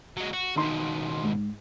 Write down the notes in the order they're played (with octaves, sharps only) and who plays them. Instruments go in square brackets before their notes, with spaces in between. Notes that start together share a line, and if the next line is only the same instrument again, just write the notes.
[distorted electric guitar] F#3 G#3
F#4
[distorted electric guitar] D#2 B2 [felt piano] D#4 C6
[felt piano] G#2